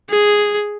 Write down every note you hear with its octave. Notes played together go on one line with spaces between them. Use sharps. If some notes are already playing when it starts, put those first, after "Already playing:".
G#4